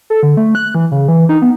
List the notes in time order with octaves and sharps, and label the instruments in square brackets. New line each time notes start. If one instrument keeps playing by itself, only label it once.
[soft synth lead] A4
D3
A3
F#6
E3
C#3
E3
D#4
B3